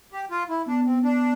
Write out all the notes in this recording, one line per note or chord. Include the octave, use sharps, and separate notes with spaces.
G4
F4
E4
B3 D4
C4
D4